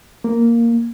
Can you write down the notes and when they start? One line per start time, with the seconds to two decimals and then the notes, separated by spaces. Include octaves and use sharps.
0.24 A#3